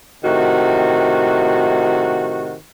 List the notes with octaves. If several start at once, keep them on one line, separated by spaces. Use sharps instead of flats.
A2 C3 D#3 F#4